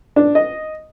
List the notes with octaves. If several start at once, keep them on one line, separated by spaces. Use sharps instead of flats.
D4
D#5